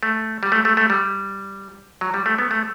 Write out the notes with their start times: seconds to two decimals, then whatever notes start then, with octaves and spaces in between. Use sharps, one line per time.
0.03 A3
0.43 G3
0.52 A3
0.65 A3
0.77 A3
0.90 G3
2.01 F#3
2.14 G3
2.26 A3
2.38 B3
2.51 A3